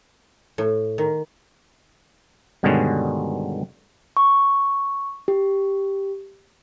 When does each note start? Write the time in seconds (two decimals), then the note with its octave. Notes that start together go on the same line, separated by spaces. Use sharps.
0.58 A2
0.98 D#3
2.63 G2 B2 D3 D#3 G#3 C#4
4.17 C#6
5.28 G4